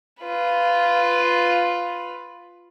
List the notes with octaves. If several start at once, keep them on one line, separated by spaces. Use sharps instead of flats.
F4 B4